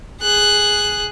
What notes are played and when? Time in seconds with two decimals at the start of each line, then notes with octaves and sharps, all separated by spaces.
0.22 G#4 F#6